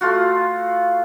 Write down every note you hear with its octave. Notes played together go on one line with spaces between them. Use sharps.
A3 F4 F#4